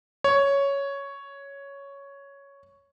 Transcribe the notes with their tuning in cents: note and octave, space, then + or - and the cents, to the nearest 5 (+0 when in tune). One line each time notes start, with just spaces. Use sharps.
C#5 +5